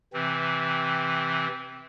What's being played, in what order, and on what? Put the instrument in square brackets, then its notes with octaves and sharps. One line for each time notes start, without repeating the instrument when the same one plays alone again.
[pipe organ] C3 E3 C4